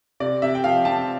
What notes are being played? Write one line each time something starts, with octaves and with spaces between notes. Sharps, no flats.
C3 D5
C3 E5
G5
F3 F5
C4 A5